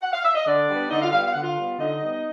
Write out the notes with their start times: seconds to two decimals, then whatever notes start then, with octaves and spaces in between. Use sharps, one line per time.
0.02 F#5
0.13 F5
0.24 E5
0.35 D#5
0.46 D3 D4 D5
0.69 G3 B3
0.90 D3 D#4 D#5
1.02 F4 F5
1.12 G3 B3 F4 F5
1.24 F5
1.33 D3 F#5
1.42 F4 F5
1.56 G3 B3
1.78 D3 D#4 D#5
2.01 G3 B3